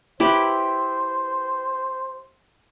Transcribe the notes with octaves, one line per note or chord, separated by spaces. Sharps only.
E4 G4 B4 C5